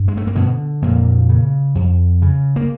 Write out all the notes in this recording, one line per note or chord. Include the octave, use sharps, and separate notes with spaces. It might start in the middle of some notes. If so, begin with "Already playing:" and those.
Already playing: G2
G#3
A3
A#3
B2 D3 B3
F2 A#2 A#3
C#3
F2
C#3
A#3